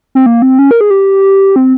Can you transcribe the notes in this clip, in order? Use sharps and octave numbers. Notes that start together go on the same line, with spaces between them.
C4
A#3
C4
C#4
A#4
G#4
G4
C4